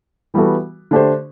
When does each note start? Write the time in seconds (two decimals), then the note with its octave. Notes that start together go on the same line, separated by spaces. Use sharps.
0.34 E3 G3 B3 F#4 A4
0.91 D3 A3 D4 G4 C5